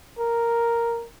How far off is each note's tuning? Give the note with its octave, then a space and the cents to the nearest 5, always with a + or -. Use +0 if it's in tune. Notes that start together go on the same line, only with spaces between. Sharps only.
A#4 +0